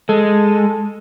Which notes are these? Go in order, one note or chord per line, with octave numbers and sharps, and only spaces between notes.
G#3 A4